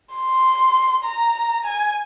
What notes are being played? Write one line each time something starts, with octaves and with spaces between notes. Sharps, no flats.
C6
A#5
G#5